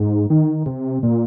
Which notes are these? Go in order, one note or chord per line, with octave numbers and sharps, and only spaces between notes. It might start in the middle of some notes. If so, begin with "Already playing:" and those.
Already playing: G#2
D#3
C3
A#2